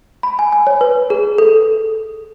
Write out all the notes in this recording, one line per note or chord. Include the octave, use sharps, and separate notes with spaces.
B5
G#5
G#5
C#5
B4
G#4
A4